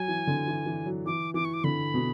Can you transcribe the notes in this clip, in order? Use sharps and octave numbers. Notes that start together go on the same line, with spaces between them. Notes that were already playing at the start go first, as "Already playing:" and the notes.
Already playing: F#3 G#5
E3
D3
E3
E3
F#3
E3 D6
E3 D6
C#6
D6
D3 B5
B2